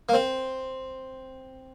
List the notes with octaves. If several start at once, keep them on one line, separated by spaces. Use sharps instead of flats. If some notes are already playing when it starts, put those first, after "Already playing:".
A#3
C4